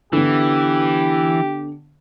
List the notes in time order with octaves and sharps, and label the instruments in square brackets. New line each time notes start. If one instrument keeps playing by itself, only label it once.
[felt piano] D3 B3 [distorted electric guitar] E3 [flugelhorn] G4